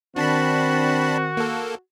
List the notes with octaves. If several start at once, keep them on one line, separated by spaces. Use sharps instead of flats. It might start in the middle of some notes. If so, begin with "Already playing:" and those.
D#3 C4 D4 F#4 A5 B5
A#3 A4